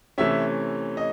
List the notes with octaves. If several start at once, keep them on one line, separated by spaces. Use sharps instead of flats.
C3 E3 A3 C#4 E5
D#5